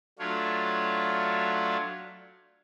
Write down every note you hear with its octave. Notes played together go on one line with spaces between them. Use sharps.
F#3 A3 D4 F4 C#5